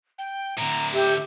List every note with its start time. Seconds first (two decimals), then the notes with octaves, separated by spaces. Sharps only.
0.18 G5
0.58 A2 D3 A#5
0.94 G4 E5